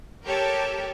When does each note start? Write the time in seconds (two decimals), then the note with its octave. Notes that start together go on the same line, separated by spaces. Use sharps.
0.25 G4 A4 A#4 C#5